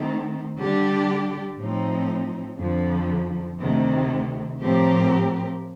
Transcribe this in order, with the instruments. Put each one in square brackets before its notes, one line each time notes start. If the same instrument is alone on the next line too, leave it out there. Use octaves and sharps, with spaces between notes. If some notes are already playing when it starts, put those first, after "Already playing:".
Already playing: [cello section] D#3 A3 C4
D3 G3 D4 G4 D5
A2 F3 C4 D#4
F2 D3 F3
D2 C3 D#3
A2 F3 C4 G4 A#4